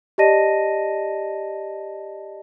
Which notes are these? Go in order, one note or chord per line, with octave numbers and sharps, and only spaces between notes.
G4 D5 D#5 A5 A#6 D#7